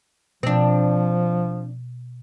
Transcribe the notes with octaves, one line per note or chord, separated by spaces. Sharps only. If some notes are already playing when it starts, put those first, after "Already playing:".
B2 F3 C4 D4